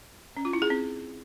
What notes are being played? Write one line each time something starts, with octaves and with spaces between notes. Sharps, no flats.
C#4
F4
E4
G#4
C4